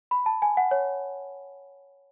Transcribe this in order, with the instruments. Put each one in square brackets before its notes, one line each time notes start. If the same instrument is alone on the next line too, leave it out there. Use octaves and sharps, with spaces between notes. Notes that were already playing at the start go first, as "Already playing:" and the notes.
[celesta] B5
A5
G#5
F#5
C#5